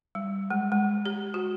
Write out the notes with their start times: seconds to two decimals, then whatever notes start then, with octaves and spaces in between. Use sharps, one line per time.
0.15 G3
0.50 G#3
0.72 G#3
1.05 G4
1.34 F#4